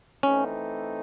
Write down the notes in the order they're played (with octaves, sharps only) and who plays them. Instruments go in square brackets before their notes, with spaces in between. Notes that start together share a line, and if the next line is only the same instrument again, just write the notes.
[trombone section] E3 A3 C4 D#4 [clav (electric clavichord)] C#4